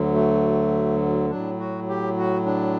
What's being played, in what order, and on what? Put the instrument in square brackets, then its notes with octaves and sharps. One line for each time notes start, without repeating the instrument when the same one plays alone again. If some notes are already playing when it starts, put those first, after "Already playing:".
Already playing: [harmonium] D2 D3 F#3
A3
A2 F#3 D4
F#4
G4
F#4
D4